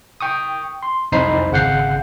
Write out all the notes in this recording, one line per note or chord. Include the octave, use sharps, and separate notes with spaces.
G5 C#6 D#6
C6
C2 F2 D#4 C5 B5 C7
G#1 C#3 F5 F#5 G6 C7